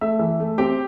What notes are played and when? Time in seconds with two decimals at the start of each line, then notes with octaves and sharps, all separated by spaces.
0.01 A3 E5
0.19 E3
0.40 A3
0.58 C4 G4 G5